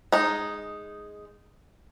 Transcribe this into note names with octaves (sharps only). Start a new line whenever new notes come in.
G#3 D#4